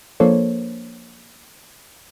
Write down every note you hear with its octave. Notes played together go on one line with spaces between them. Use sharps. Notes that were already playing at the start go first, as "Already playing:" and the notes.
F3 A#3 D4 A4 C5 C#5